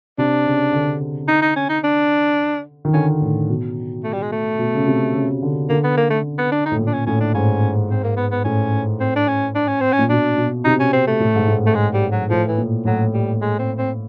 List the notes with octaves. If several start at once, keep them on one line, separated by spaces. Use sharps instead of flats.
C3 D4
C#3
D3
D#4
D#4
C#4
D#4
D4
D#3
D3 C#4
A2
B2
A3
G3
G#3
A3
B2
C#3
C3
C#3
D3
D3 A#3
B3
A#3
A3
B3
D4
D#4
A2
A#2
D4
C#4
A2 C#4
D4
G#2 C#4
C4
A#3
B3
B3
A2 C#4
C4
D4
C#4
D4
C#4
C4
C#4
A#2
B2 D4
B2
C3 D#4
C#4
C4
A3
A2
G#2
A2
A3
G#3
G3
F#3
A2 F3
E3
A#2
A2 F#3
G3
G#3
C4
C4